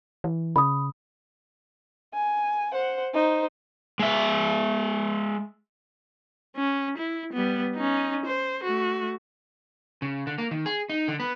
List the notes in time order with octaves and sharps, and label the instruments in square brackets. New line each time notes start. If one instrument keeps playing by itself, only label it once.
[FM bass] E3
[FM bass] C#3 [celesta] B5 D#6
[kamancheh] G#5
C5 F#5
D#4 C5
[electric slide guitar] G#3 E5
[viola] C#4
E4
G3 B3
C#4 D#4
C5
A3 F#4
[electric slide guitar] C#3
D3
A#3
D#3
G#4
D#4
D3
B3